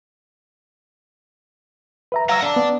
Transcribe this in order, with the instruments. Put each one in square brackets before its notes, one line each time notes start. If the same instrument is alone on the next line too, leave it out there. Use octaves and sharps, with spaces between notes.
[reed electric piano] B4 E5 A#5
[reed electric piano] F5 E6 [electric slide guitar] F#5 A#5
[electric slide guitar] D4
[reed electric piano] B3 D5